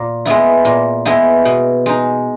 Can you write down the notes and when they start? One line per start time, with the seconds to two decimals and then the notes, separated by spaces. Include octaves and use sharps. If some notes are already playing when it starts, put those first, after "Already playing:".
Already playing: A#2
0.25 G#3 B3 E4
0.65 A#2
1.05 G#3 B3 E4
1.45 B2
1.86 G#3 D#4